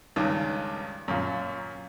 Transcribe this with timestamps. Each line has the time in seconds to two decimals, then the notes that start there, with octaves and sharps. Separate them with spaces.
0.16 C#2 G2 D#3
1.08 F#2 A#2